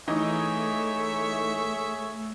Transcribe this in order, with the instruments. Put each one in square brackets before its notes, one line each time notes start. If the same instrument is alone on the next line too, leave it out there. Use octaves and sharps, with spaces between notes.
[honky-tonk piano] E3 D#4 [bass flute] A3 [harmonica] G#4 C#5 E5